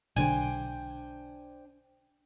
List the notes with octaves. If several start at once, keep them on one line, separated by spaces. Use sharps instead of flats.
B1 D3 D4 C5 G5 G#5